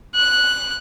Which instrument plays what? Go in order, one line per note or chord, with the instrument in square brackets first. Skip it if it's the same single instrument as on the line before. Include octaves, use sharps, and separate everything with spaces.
[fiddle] F#6